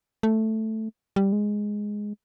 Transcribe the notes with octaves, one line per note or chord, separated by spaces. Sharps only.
A3
G3
G#3